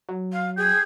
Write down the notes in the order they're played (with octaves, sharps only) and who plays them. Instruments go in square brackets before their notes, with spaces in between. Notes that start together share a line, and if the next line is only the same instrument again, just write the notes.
[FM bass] F#3
[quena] F5
[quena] G#4 [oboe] G5